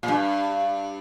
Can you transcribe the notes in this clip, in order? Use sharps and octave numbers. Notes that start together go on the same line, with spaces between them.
A#2
G2